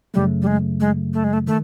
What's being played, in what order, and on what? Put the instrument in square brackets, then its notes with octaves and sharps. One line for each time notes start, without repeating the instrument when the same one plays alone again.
[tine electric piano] F#2 C#3 F#3 A3 [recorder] G3
[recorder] G3
G#3
G#3
A3
G#3
A3
[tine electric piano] D#3 [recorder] A3